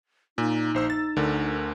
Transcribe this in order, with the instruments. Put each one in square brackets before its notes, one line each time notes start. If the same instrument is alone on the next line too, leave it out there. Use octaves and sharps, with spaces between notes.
[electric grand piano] A#2 [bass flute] D#4
[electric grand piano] A#1 C5 E6
A6
D2 D3 A#4